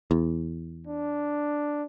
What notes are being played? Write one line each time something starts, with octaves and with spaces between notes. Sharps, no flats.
E2
D4